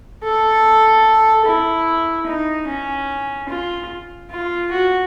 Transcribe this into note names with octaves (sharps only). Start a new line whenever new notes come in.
A4
E4
D#4
C#4
F4
F4
F#4